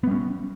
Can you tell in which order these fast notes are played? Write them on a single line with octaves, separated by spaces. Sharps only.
B3 G3 C#4